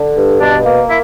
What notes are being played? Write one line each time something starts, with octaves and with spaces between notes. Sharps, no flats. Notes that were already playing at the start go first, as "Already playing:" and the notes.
Already playing: D3
G2
B2 D4
A#3
E4